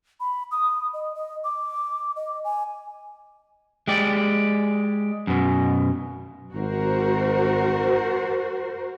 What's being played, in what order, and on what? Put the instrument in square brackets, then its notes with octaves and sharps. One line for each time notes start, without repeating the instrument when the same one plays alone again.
[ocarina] B5
D#6
D#5
D#5
D6
D#5
G#5
[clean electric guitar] G#3 G4 D5
F#2 B2
[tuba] G#1 [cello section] F#4 A#4 C5